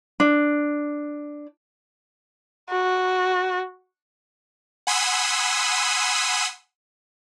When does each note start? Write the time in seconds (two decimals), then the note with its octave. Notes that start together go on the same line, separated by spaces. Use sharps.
0.20 D4
2.70 F#4
4.87 F#5 G#5 B5 C6 D#6 E6